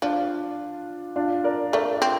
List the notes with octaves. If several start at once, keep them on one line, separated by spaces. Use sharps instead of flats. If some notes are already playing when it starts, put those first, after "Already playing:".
F3 D4 F4
D4 F4
A#4 D5
A3 A#4 D5
C4